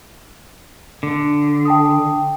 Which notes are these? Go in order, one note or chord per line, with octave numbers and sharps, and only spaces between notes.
D3
G5 A5 D#6